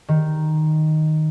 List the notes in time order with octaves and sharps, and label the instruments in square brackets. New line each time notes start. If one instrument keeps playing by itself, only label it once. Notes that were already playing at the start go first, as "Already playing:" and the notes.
[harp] D#3